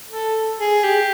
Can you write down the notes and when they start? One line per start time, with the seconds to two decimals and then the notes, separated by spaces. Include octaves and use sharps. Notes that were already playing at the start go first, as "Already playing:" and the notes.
0.09 A4
0.60 G#4
0.84 G4